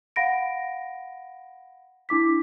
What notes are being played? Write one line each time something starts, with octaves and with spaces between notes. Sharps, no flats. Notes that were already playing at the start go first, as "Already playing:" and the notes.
F5 F#5 B5 A#6 D7
D4 E4 D6 B6